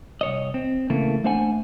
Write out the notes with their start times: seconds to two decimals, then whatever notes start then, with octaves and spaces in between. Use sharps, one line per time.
0.21 C2 C#5 D#5
0.54 C4
0.90 C#3 E3 A3 A#3
1.24 A3 D4 C5 F#5 G#5